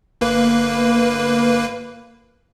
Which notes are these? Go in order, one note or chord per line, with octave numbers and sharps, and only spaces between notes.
G1 A#3 B4